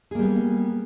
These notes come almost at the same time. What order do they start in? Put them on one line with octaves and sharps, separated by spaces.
G#4 A#3 G3 B3